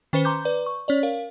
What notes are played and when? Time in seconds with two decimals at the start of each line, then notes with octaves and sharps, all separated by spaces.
0.13 D#3 C#4 B4 C5 C#7 G7
0.25 A#5 C6 D6 G6
0.45 B4 D5
0.66 C#6
0.88 C#4 C#5 D5
1.03 A#4 F5